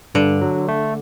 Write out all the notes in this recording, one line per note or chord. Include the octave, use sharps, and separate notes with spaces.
G2 D3
F#3
A3